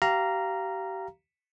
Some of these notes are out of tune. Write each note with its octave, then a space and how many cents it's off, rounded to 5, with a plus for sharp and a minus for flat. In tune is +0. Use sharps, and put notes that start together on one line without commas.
G4 -30 F5 -20 A#5 +0